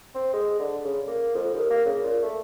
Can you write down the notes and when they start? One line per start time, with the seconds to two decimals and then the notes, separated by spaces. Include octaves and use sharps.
0.15 C4
0.33 G#3
0.59 D3
0.85 C#3
1.07 A#3
1.35 F2
1.54 D#2
1.70 A#3
1.86 C#3
2.03 A#2
2.23 A3